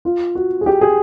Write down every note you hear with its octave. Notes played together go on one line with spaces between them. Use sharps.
F4
F#4
G#4
G4
G#4